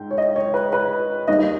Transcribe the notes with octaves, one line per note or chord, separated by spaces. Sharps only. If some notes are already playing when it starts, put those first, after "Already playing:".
Already playing: G#2 G5
C#5
D#5
C#5
B4
B4
D#2 D#3 G3 D#5